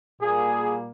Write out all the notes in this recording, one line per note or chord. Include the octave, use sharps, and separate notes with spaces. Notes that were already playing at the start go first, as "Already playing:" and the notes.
A#2 G3 A#3 G#4